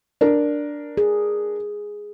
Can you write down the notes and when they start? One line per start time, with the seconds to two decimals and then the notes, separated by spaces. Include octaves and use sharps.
0.21 D4 A#4
0.97 G#4